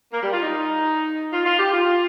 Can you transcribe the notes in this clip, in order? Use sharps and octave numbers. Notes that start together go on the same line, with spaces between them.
A#3
G3
F4
D#4
F4
F4
G4
F4